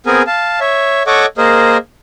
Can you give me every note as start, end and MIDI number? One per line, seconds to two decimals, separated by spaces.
0.06 0.22 59
0.06 0.22 60
0.06 0.22 68
0.06 0.22 70
0.06 0.22 80
0.27 0.60 77
0.27 0.60 81
0.60 1.03 73
0.60 1.03 76
1.07 1.26 69
1.07 1.26 73
1.07 1.26 75
1.07 1.26 78
1.07 1.26 85
1.07 1.26 86
1.38 1.77 58
1.38 1.77 68
1.38 1.77 70
1.38 1.77 72
1.38 1.77 75